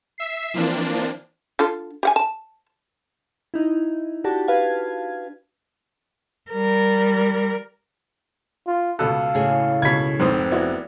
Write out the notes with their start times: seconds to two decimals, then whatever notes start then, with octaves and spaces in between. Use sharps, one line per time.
0.18 E5 C7
0.54 E3 F3 A#3 C4 D4
1.59 D3 F4 A4
2.03 G4 F#5 G#5
2.16 A5
3.54 D#4 E4
4.24 D4 F#4 G4 A5
4.48 B4 F5 G#6
6.51 G3 A#4
8.67 F4
8.99 C#2 B2 A4 F5 F#6
9.35 A2 C#3 G#4
9.82 C#2 B2 G#6 B6
10.20 F1 G#2 C4 D#6
10.51 B3 E4 F#4 D5